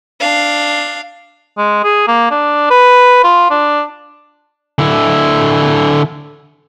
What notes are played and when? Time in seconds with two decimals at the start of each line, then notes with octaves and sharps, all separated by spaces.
0.20 D4 F5
1.58 G#3
1.84 G#4
2.07 A#3
2.31 D4
2.70 B4
3.24 F4
3.51 D4
4.79 D3 E4